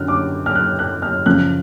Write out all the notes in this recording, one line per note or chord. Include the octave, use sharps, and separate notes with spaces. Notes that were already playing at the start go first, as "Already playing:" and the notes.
Already playing: F#2 D3 F#3 F6 F#6
D6
F6
F#6
F#6
F6
F#2 C#3 F3 F#6